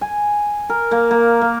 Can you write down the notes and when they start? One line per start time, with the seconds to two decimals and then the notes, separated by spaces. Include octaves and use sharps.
0.01 G#5
0.70 A#4
0.91 A#3
1.11 A#3
1.41 A#3